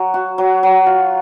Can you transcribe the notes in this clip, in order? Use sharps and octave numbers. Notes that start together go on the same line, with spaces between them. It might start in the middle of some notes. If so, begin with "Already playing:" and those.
Already playing: F#3
F#4
F#3
F#3
F4